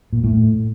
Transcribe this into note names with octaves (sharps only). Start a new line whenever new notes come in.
A#2
A2